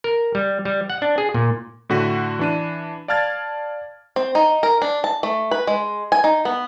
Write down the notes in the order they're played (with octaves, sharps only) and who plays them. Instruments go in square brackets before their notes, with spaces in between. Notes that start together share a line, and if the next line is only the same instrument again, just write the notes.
[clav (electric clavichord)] A#4
G3
G3
F#5
D4
G#4
A#2
[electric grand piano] A2 D3 F#4 F#5 B6 D#7
E3 D4 D#7
D5 F5 A5 F6 G#6 A6
[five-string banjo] C4
D#4
A#4
D4
A5
A3
B4
G#3
G#5
D#4
B3